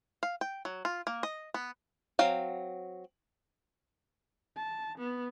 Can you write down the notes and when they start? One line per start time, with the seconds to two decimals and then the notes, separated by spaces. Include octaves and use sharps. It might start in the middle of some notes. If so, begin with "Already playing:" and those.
0.23 F5
0.41 G5
0.65 F#3
0.85 F4
1.07 A#3
1.23 D#5
1.54 B3
2.19 F#3 C4 F5
4.57 A5
4.98 B3